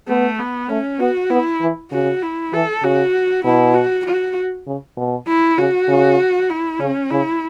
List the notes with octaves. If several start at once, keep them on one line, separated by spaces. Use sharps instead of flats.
A3 B3
B3
A3 C#4
B3 F#4
B3 E4
E3
C#3 F#4
E4
E3 A4
C#3 F#4
B2 E4
F#4
F#4
C#3
B2
E4
C#3 F#4
C#3
E4
C#3 C#4
C#3 E4